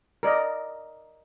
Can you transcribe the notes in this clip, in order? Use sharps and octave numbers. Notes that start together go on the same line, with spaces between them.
A#4 D5 D#5